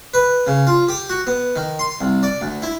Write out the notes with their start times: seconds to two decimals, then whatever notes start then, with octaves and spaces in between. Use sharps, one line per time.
0.14 B4
0.47 C#3
0.67 F4
0.88 G4
1.10 F#4
1.27 B3
1.56 D#3
1.79 C6
2.01 C2
2.23 D5
2.41 D2
2.62 E4